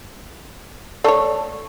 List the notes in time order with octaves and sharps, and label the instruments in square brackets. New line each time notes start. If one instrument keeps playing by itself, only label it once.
[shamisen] A3 C#5 [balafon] D5 A5 C#6